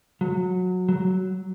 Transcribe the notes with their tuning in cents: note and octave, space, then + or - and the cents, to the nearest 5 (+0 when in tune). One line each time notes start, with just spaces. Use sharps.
F#3 -20
F#3 +10